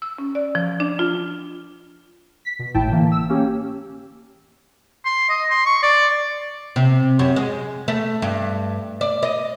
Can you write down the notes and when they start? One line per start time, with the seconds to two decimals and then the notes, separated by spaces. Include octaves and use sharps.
0.02 E6
0.18 C#4
0.35 D5
0.55 F3
0.80 D4
0.99 F4
2.45 B6
2.59 B2
2.74 G#1 A2 E4 G5 A5
2.91 D3 E3 A#3
3.12 E6
3.29 A#3 C#4 G4
5.05 C6
5.30 D#5
5.50 C6
5.66 C#6
5.83 D5
6.76 C3
7.19 F#2
7.36 G#3
7.88 A3
8.22 G2
9.01 D5
9.23 D#5